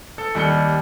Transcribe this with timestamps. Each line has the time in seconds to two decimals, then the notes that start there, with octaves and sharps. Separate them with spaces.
0.18 A4
0.35 D#2 G3 C#7 G7